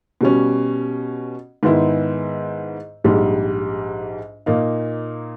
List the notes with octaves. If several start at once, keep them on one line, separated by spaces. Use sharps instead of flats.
B2 G3 C#4
G#2 D#3 G#3 B3 E4
A#1 G#2 G3
A#2 A#3 D#4